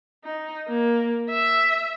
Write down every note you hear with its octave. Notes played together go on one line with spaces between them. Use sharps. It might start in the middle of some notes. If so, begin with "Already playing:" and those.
D#4
A#3
E5